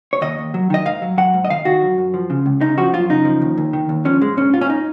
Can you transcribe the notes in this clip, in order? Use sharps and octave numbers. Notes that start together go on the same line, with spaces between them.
C#5
D#2 D#5
D#2
F#3
D#3 D#5
G#2 F5
F#3
F#3 F#5
G#2
D#5
D#3 F5
D#3 F#4
F#2
F#2
F3
C#3
C#2
C#3 D#4
F3 F#4
F#2 F4
C#3 D#4
F3
D#2
D#2
D#3
D#2
F3 C#4
G#2 G#3
G#2 C#4
G#2 F4
C#4
D#4